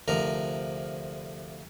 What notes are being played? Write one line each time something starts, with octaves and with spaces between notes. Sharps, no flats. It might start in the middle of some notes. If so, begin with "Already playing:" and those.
D2 C3 F3 A#4